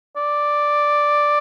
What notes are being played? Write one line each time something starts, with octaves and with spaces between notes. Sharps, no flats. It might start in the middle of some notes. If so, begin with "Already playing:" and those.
D5